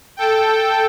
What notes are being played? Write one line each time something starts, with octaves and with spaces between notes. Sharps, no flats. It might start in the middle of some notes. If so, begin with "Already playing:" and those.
A4 G5